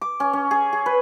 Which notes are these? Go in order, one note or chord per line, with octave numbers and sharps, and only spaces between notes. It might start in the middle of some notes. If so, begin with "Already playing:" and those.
D6
C#4
C#4
G#4
G#4
B4